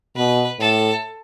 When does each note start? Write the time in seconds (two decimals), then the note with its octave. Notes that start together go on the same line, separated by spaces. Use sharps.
0.16 B2 B4
0.59 A2 A4